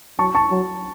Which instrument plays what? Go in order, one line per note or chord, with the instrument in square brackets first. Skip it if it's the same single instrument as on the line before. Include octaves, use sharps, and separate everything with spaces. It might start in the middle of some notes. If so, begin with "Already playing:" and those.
[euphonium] F#3 [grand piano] A5 C#6
[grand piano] A5 C#6
[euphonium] F#3